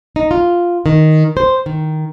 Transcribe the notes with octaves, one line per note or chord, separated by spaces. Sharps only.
D#4
F4
D#3
C5
D#3